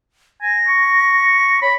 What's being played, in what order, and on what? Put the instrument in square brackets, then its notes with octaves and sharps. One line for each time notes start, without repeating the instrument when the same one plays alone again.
[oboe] G#5 [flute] A#6
[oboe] C#6
[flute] C#5 [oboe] B5